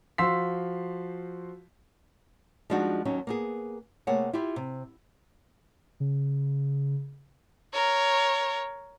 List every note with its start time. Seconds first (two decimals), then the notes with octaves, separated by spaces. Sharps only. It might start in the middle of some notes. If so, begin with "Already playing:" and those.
0.18 F3 F#4 F5 C6 E6 B6
2.70 F3 G3 G#3 D4 D#4 F#4
3.05 D#2 F#3 C#4 D#4
3.27 A#3 B3 G#4
4.07 C3 A3 A#3 G#4 C#5 F#5
4.33 E4 F4 G4 E5
4.56 C3
6.00 C#3
7.73 A#4 C#5